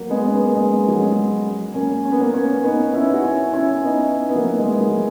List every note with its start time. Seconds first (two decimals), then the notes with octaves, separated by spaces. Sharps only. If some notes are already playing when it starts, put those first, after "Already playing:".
Already playing: F#3 A#3
0.10 G#3 B3
0.25 C#4
0.35 B3
0.45 A#3
0.55 G#3
0.88 F#3
1.00 G#3
1.74 A#3 C#4
2.05 C#4
2.12 B3
2.20 A#3 C#4
2.34 A#3 C#4
2.63 B3 D#4
2.93 C#4 E4
3.14 F#4
3.24 C#4 E4
3.53 C#4 E4
3.83 B3 D#4
4.29 B3
4.35 F#3 A#3
4.52 A#3
4.58 G#3
4.80 F#3 A#3